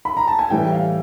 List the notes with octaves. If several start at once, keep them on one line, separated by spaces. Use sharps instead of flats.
B5
A#5
A5
G#5
A2 E3 G3 G5
F5